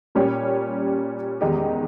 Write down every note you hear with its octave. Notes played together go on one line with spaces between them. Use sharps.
A#2 G3 C#4 G4 C#5
E2 D#3 G#3 D#4 G4